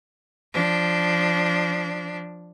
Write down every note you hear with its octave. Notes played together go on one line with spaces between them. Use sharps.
F3 D4